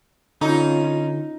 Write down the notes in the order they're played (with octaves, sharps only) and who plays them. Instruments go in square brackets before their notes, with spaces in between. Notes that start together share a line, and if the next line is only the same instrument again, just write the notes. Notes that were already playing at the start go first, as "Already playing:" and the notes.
[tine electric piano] D3 [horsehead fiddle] C#4 F4 [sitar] D#4